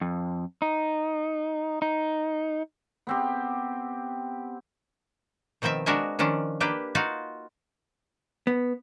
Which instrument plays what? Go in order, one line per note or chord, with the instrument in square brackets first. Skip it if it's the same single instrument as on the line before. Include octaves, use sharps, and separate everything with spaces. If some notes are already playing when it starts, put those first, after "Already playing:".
[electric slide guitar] F2
D#4
D#4
[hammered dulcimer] B3 C4 G4
[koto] B2 D#3 F3 C4 E5
G#3 D4 F#4 A#4 E5 G#5
D#3 F3 C#4 D4
A#3 D4 G4 B4 G5
D#4 F4 F#4 F5
[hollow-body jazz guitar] B3